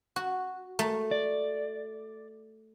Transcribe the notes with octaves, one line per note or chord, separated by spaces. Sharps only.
F#4
A3
D5